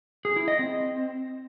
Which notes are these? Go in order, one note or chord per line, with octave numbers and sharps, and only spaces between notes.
G#4
E4
D#5
C4